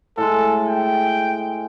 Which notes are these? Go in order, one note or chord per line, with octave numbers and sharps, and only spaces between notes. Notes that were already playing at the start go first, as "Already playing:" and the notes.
A2 G#3 A4
G5